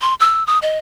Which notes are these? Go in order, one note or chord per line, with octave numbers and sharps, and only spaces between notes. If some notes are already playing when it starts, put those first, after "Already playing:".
C6
E6
D#6
D#5